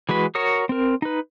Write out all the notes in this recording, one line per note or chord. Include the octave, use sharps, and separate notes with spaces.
E3 G#3 F#4 B4
F#4 A#4 C#5 D#6
C4 A#4
D#4 B4